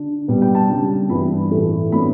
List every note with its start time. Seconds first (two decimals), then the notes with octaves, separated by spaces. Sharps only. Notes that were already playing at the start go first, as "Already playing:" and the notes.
Already playing: D3 D4
0.28 B2 G3 B3
0.42 G5
0.55 A5
0.69 C#3 G3 D4
1.10 G2 E3 B3 D4 B5
1.50 A2 E3 A3
1.92 A2 F#3 B3 D4 B5